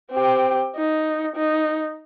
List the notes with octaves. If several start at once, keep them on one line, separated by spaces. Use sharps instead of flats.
C4 G4
D#4
D#4